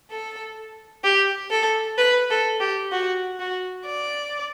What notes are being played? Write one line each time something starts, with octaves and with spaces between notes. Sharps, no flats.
A4
G4
A4
B4
A4
G4
F#4
F#4
D5